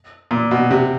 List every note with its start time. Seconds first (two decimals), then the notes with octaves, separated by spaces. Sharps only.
0.31 A#2
0.51 B2
0.71 C3